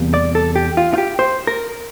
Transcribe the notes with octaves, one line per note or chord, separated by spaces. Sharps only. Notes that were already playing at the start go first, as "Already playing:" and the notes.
Already playing: E2 C3 G3 A#3
D5
A4
G4
F4
F4
G4
C5
A#4